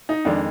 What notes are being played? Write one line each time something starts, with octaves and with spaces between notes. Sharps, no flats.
D#4
F2 D#3 G#3 D4